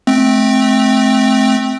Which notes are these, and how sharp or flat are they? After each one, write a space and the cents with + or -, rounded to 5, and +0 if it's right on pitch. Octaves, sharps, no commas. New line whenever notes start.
A3 -30 C4 +0